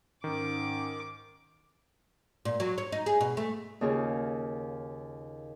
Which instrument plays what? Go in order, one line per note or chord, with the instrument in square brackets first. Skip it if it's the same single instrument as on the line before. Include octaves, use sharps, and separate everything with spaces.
[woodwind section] G#2 C#4 [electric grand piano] D#3 [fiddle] D6
[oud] A#2
F#3
C#5
D#4
G#4
B2
A3
[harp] D#2 C#3 F4 G#4